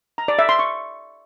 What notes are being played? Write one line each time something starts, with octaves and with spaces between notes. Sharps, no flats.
A#5
D5
E5
C6
C#6